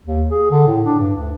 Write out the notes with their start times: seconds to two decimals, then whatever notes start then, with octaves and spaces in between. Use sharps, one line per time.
0.05 D#2
0.31 G#4
0.51 D3
0.67 A2
0.85 D4
0.99 G2
1.16 D2